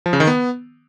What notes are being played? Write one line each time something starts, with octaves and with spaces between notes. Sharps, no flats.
F3
C#3
D#3
B3